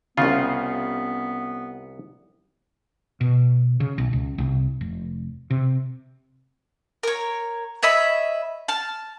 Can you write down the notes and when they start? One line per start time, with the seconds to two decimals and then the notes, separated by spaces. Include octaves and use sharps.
0.17 C2 C#3 B3 F4
3.21 B2
3.80 C#3
3.98 B1
4.13 C#2
4.38 C2
4.81 F1
5.50 C3
7.03 A#4 C#5
7.83 C#5 D#5 E5 B5
8.68 A5 F6